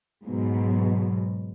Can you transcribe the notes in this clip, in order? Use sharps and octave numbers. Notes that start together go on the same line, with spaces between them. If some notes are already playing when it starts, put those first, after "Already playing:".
G#2 B2 F#3